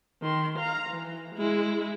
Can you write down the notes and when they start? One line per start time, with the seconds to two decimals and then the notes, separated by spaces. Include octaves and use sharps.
0.22 D#3 C6
0.59 F5 A#5
0.90 E3
1.35 G#3 E4